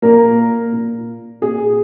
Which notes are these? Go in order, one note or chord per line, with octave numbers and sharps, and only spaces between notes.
A#2 A#3 A#4
A#2
A#2 G#4